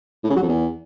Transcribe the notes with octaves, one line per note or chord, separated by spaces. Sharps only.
A2
C#3
F#3
F2
E2